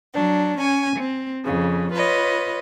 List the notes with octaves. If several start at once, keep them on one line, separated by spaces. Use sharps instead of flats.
F#3 D4
C#4 G#5
C4
F2 C#3
F4 B4 C#5 D#5